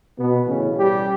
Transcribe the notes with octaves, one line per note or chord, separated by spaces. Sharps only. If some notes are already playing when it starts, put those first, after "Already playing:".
B2 B3
A2 C#3 E3 C#4
G3 G4